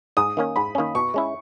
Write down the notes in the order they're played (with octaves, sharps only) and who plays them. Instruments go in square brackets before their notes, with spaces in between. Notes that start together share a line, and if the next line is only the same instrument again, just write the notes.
[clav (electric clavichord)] G#2 [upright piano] D#6
[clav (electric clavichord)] D#3 A#3 C#4
[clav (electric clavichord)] G#2 [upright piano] B5
[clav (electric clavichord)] D#3 A#3 C#4
[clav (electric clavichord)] B2 [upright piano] C#6
[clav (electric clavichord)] G#3 C#4 E4